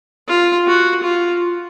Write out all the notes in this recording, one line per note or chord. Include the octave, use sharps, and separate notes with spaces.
F4
F#4
F4